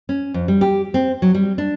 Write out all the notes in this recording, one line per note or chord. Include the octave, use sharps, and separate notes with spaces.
C#4
F2
G3
G4
C4
F#3
G3
D4